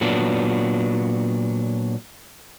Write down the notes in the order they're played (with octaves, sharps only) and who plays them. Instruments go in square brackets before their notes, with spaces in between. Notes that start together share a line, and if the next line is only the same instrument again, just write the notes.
[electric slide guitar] A#2 F#3 B3 D4